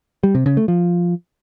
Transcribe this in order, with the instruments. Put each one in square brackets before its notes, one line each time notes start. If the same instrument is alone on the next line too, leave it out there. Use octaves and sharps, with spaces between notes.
[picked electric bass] G3
C3
C#3
A3
F3